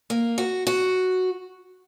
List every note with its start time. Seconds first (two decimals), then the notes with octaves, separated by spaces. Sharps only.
0.10 A#3
0.38 F#4
0.67 F#4